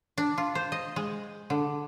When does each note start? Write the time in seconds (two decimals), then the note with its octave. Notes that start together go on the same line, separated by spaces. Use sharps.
0.18 D4
0.38 F4
0.55 C5
0.72 D#5
0.96 G#3
1.50 D3